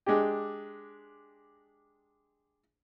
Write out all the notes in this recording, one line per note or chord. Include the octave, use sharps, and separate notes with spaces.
G#3 D4 G4